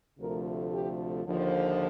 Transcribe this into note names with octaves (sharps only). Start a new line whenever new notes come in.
D2 C3 F3 A3 A#4
G4
D#2 D3 F3